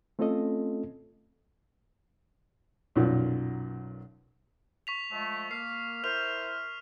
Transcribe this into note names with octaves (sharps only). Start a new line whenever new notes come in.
A3 C4 C#4 F4 A4 D#5
B1 F#2 A#2
C#6 B6 F7
F3 G#3 A3
A#3 F6 C7
E4 A#4 C5 F6 F7